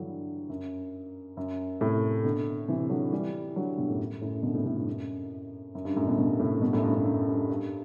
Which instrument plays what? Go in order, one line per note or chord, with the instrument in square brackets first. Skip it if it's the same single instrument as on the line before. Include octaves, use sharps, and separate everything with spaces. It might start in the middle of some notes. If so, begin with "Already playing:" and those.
Already playing: [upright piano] G2 D3 E3 F#3 G3
F#2
F#2
A2 C3
B2 D3
C3 E3
D3 F#3
E3 G3
D3 F#3
G2 B2
F#2 A2
F#2 A2
B2 D3
A2 C3
F#2 A2
G2
F#2
F#2
G2
F#2 A2
G2 B2
G2 B2
A2 C3
G2 B2
F#2 A2
G2
G2
F#2
G2
G2